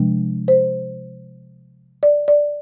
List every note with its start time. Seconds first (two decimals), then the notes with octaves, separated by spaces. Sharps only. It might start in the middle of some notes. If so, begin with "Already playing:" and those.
Already playing: C3 F3 G#3 D4
0.48 C5
2.03 D5
2.28 D5